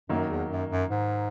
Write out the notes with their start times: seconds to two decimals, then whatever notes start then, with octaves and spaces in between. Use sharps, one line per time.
0.09 F#2 D#3 F#3 A#3
0.30 E2
0.50 F#2
0.70 F#2
0.91 G#2